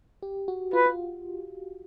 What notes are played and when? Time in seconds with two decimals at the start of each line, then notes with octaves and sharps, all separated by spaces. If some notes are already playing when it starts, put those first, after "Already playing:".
0.22 G4
0.48 F#4
0.73 F4 B4
0.86 F4